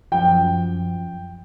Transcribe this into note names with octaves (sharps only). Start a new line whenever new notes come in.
F#2 F3 G5